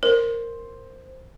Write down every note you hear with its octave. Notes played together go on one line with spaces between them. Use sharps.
A#4 C5